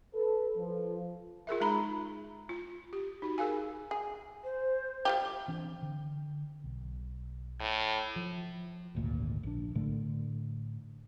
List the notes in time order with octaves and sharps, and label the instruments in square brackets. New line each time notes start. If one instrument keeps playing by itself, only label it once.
[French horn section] A4 B4
F3
[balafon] F4 G#4 A#4 E5
G#3 D#4 A#5 B5
F4
G4
D#4 F#4
G#4 A#4 F5 G#5
[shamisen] G#4
[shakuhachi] C5
[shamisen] G3 F4 G4
[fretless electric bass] E3 C4 D4
D3
B1
[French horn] A2
[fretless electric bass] F3
G#1 D2 A#2
A#1 D4
A2 D3 A3